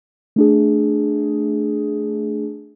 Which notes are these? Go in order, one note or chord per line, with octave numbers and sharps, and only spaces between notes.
A3 D4 G#4